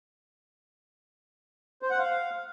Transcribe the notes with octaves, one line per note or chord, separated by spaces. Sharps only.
C5
F#5
F5